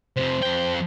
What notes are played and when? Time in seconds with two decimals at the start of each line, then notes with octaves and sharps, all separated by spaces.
0.17 F2 C3 C5
0.43 F2 G5